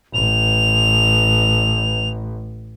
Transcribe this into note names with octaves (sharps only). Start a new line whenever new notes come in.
A1 F7